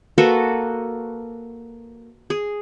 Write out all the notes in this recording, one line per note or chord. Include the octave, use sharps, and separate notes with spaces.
A#3 F#4 A4 B4
G#4